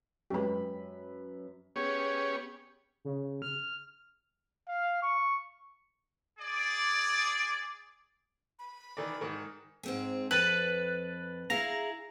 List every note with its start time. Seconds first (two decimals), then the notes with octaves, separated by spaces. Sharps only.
0.30 F#2 G#3 G4 B4 B5
1.76 B3 C#4 G4 G#4 C#5
3.05 C#3
3.42 F6
4.68 F5
5.02 C#6
6.38 G#4 D5
8.59 B5
8.97 D#3 E3 D5
9.21 G#2 D#3
9.83 G#2 C4 G#4
10.31 F2 B4 F#6 A6
11.50 E4 G#4 F5 A#5